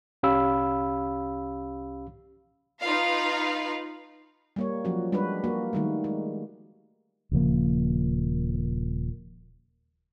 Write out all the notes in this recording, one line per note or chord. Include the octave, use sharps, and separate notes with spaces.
C2 C#4 G4 F5 B5 E6
D#4 F4 B4 F5
G3 A#3 C#5
F3 F#3 C#4 F#4
G3 G#3 D4 F#4 B4
A#3 F#4
D#3 G3 A3
G#3
D#1 C#3 F3 A#3